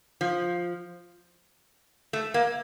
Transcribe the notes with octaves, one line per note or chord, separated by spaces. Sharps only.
F3
A3
A#3